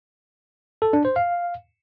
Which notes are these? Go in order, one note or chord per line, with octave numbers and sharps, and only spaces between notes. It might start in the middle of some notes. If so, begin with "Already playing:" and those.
A4
D4
C5
F5